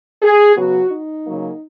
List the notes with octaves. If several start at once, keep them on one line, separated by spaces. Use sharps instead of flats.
G#4
C#3 F#3 B3 F#4
D#4
C#3 F#3 A#3